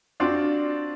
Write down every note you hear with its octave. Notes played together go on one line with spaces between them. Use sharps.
C4 D4 F4 F#4 C5 D5